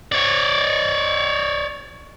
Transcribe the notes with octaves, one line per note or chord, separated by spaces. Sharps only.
C#5 D5